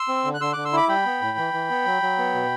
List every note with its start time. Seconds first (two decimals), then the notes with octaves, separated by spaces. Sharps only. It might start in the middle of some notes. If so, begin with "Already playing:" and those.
Already playing: C6 E6
0.08 C4
0.25 D3
0.34 F#6
0.41 D3 C6 E6
0.53 D3 D6 F#6
0.65 C6 E6
0.73 E4 B5 D6
0.89 G3 G5 B5
1.06 B3
1.22 A2
1.38 E3
1.53 E3
1.70 B3
1.86 F#3
2.02 F#3
2.18 B3
2.34 B2